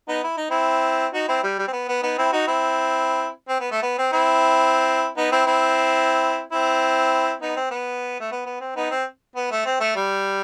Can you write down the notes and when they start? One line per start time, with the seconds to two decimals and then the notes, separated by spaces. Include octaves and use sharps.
0.08 B3 D#4
0.24 E4
0.37 D#4
0.50 C4 E4
1.13 D#4 F#4
1.28 C4 E4
1.43 G3
1.59 G3
1.67 C4
1.72 B3
1.89 B3
2.02 B3 D#4
2.18 C4 E4
2.32 D#4 F#4
2.47 C4 E4
3.49 C4
3.60 B3
3.71 A3
3.83 B3
3.98 C4
4.13 C4 E4
5.17 B3 D#4
5.31 C4 E4
5.46 C4 E4
6.52 C4 E4
7.42 B3 D#4
7.56 C4
7.71 B3
8.20 A3
8.31 B3
8.46 B3
8.60 C4
8.76 B3 D#4
8.90 C4
9.36 B3
9.51 A3
9.66 C4
9.80 A3
9.96 G3